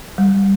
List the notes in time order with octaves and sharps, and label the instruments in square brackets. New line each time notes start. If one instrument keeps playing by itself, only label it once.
[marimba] G3